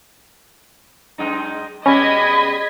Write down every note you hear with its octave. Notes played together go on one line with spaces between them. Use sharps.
F#2 G#3 D#4
B2 G3 G#3 C#4 D#5 B5 G#6 B6